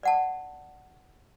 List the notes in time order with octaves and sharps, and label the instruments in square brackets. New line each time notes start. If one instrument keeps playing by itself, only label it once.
[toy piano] D5 F#5 A5